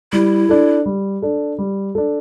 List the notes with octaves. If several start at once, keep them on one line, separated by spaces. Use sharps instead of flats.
G3 E4
D4 A4
G3
D4 A4
G3
D4 A4